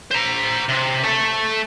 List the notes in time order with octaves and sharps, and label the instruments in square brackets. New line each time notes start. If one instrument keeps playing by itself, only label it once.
[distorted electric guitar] C5 A#5
C3
A3 A4